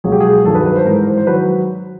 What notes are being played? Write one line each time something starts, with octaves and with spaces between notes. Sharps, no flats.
C#2 B2 F#3 G#4
G4
G#4
G2 D#3 F#3 A4
B4
B4
C5
G#2 E3 A#4
C5
C5
D#3 F#3 B4